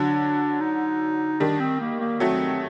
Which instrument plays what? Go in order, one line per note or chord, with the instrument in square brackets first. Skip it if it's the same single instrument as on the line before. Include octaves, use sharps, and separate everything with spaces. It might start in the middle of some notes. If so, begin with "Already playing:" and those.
Already playing: [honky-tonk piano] D3 F#3 [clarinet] D4
[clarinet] D#4
[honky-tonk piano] D#3 G3 [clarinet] D4
[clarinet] C4
A#3
A#3
[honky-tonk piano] F#3 A3 [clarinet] C4